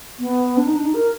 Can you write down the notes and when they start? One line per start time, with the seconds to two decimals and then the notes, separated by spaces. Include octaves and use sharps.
0.19 B3
0.57 D4
0.67 D#4
0.75 D4
0.85 D#4
0.94 A#4